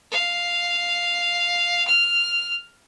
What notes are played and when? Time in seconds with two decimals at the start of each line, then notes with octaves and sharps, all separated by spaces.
0.11 F5
1.87 F6